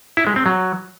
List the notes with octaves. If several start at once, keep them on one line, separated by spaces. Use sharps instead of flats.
E4
G#3
C4
F#3